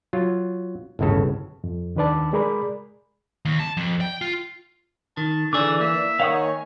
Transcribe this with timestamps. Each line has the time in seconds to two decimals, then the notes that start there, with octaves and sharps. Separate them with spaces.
0.13 F#3 F4
0.99 G1 D#2 A2 C#3 A4
1.64 F2
1.96 D#2 D#3 D4 B4 D5 A5
2.33 G#3 G#4 A#4 D5 B5
3.45 D#2
3.60 A5
3.77 F2
4.01 G5
4.21 F4
5.17 D#3 A5
5.53 D3 E3 G#4 D5 D6 E6
5.81 A#3 E5
6.20 D#3 C#5 F5 F#5 D#6
6.35 G#5